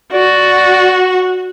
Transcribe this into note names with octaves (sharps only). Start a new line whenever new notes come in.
F#4 D5